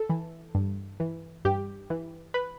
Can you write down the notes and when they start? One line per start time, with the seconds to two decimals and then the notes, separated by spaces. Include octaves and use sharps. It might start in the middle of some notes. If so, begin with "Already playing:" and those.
Already playing: A4
0.10 E3
0.55 G2
1.00 E3
1.45 G2 G4
1.90 E3
2.34 B4